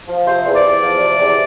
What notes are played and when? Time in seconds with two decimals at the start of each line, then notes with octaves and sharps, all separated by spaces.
0.08 F3
0.27 C3 C5
0.46 E2
0.54 D5
0.63 E2
0.83 F3
1.01 C3
1.19 E2